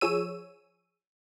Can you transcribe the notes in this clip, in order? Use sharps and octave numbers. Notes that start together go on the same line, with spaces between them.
F3 G#4 C#5 E6 D#7